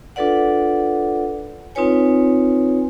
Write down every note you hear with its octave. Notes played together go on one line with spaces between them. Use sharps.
D4 F4 A4 B4 D5 F#5
C4 D#4 F4 B4 C#5 G#5